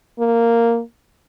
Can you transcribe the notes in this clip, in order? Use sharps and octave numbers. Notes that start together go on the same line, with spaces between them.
A#3